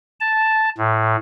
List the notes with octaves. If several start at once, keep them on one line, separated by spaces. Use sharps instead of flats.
A5
A2